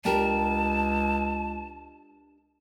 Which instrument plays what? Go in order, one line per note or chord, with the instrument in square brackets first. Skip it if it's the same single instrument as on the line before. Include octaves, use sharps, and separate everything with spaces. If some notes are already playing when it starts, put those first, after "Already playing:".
[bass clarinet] C#2 [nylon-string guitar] D4 G4 A#4 [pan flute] A5